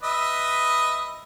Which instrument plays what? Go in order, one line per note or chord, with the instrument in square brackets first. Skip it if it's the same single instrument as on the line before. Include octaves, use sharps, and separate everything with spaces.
[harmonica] B4 D#5 E5